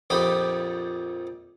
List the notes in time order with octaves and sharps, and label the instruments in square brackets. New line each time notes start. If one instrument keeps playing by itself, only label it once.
[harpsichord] A#1 F2 D#4 G4 B5